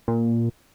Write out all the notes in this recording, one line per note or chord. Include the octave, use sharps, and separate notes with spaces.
A#2